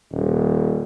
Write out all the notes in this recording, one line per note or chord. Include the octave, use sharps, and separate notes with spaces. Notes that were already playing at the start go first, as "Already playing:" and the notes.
D#1